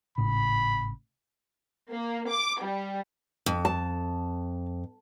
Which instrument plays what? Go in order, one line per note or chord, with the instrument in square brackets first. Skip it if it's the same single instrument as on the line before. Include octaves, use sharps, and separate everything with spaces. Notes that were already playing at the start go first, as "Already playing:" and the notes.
[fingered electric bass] G#1 A2 C#3 [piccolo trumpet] B5
[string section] A#3
D6
G3
[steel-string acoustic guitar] F2
[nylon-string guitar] A5